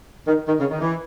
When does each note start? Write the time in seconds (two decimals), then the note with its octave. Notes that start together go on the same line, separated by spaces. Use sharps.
0.27 D#3
0.48 D#3
0.60 C#3
0.71 D#3
0.81 E3